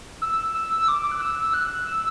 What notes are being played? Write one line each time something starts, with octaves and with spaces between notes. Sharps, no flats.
E6
E6
D6
F#6
E6
F#6
E6